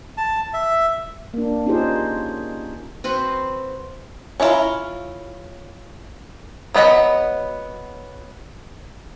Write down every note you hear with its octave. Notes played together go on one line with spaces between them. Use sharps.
A5
E5
A#3 D4
C#4 D#4 F4 G4 G#4 C5
C4 F#4 B4 C5
C#4 D4 E4 F4 A#5
F#3 B3 C4 D#5 B5